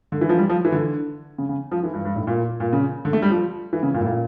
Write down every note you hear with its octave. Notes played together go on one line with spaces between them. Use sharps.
D3
E3
F3
G3
F3
E3
D3
C#3
C#3
F3
E3
G2
G2
A2
A#2
A#2
C#3
D3
A3
G3
F3
E3
C#3
A#2
A2
A#2